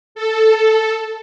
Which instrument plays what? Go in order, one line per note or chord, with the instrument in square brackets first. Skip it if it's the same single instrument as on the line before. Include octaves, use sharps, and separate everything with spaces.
[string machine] A4